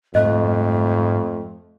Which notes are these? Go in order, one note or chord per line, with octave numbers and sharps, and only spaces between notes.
F2 G#2 G3 A3 A#3 D#5 F#6